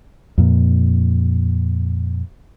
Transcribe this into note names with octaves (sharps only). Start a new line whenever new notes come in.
F2 A#2